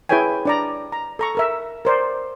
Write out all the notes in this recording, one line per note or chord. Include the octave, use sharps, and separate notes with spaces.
E4 G#4 B4 C#5 G5 G#5
D4 D5 A#5
A#5
A4 A#5 C#6
A4 A#4 E5
A#4 C5 D5